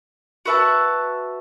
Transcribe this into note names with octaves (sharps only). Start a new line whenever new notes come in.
F#4 B4 E5 A5